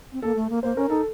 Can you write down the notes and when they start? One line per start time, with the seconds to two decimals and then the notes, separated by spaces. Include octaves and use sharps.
0.13 C4
0.22 A#3 A4
0.36 A3
0.50 A#3
0.63 A#3 C5
0.76 C#4 A#4
0.89 D#4 A4